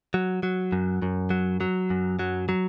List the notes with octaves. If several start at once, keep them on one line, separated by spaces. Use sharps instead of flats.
F#3
F#3
F#2
F#2
F#3
F#3
F#2
F#3
F#3